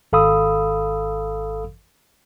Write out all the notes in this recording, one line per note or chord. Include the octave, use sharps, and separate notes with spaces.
G#1 A4 F5 B5 D#6 E6